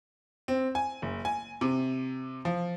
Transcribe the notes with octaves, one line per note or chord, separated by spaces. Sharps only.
C4
G#5
F#1
G#5
C3
F3